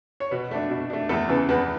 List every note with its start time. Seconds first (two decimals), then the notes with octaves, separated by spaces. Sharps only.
0.20 C#5
0.31 B2 B3 B4
0.51 A3 D4
0.70 B2
0.90 A3 D4
1.09 E2 A3 A4
1.29 C#3 E3 B3
1.49 E2 B3 B4